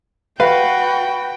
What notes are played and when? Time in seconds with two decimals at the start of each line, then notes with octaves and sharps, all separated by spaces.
0.40 F#4 B4 F5 G5